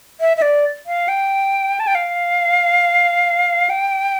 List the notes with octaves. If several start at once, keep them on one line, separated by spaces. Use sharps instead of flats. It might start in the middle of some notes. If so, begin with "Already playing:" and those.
E5
E5
D5
F5
G5
A5
G5
F5
G5